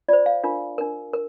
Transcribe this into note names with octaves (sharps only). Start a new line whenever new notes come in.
F4 C5 D5
F5
D4 F4 A#4
D4 A#4
A#4